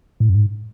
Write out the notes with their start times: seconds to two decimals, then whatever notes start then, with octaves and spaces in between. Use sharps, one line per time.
0.20 A2
0.29 F#2
0.35 G#2